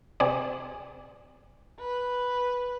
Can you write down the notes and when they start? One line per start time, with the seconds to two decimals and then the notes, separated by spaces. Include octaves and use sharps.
0.20 C3 G#4 D5
1.80 B4